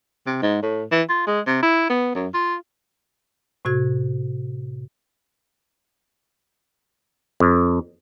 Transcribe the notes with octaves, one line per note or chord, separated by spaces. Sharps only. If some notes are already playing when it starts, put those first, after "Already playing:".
C3
G#2
A2
E3
F4
G#3
C3
E4
B3
F#2
F4
A2 C3 F#4 G#6
F2